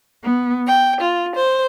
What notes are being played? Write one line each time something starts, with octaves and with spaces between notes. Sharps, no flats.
B3
G5
F4
C5